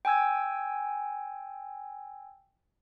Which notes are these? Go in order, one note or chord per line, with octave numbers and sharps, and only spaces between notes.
G5 G#5 E6 G#6